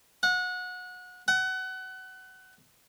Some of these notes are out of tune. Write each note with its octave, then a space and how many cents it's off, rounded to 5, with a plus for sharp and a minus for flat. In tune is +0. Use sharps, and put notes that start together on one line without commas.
F#5 -25
F#5 +25